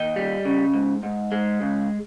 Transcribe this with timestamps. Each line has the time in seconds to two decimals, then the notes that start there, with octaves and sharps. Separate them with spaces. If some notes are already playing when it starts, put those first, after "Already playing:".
Already playing: D#2 D#5 G5
0.16 G3
0.45 C#3
0.74 G#2
1.03 G#2
1.32 G#3
1.61 C#2